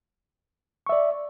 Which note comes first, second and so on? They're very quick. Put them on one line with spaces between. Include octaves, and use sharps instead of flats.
C#6 E5 D5